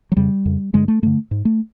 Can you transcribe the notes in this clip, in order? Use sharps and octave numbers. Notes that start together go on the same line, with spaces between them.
F#3
F2 C#3 G3
F2 C#3
G2 D3 G#3
A3
G2 D3 A3
G#2
A3